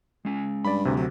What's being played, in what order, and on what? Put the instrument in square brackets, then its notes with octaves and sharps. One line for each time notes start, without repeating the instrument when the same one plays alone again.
[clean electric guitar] G#3 C#4 G#5
[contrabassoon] G2 [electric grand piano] D5 B5
[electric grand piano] D2 C3
[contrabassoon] F#3